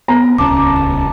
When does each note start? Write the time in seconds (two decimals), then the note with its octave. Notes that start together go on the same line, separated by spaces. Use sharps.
0.08 B3 A#5
0.38 D#1 C#2 C#4 A5 D6